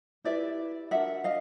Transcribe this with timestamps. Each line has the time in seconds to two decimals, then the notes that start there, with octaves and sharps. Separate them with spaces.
0.24 E4 G4 B4 D5 E5
0.91 D4 F#4 A#4 E5 F#5
1.24 D#5 F5